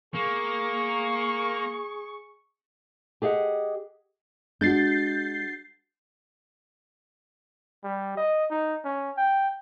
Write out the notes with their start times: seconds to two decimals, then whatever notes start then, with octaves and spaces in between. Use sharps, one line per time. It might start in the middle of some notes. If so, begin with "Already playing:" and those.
0.14 A#3 G#4 C#6
3.22 G4 G#4 D#5 F5 F#5
4.61 G#3 D4 F#4 G6 A6 C7
7.84 G3
8.17 D#5
8.50 D#4
8.85 C#4
9.17 G5